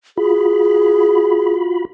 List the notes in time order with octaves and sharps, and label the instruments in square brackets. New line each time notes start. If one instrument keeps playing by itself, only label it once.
[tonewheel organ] F4 F#4 B5 [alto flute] G#4